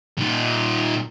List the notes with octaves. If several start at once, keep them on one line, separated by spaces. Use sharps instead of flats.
A#2 D#4